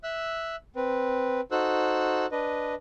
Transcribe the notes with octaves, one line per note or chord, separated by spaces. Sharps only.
E5 E6 F#6
C4 B4
D#4 F#4 A4 C5 E6 F#6
D4 B4 D#5